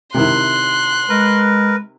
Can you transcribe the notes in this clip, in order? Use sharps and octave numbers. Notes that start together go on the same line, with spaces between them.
C3 D#3 E4 C6 F#6
G#3 A#4 B4